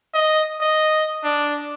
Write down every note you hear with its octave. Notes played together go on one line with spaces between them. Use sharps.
D#5
D#5
D4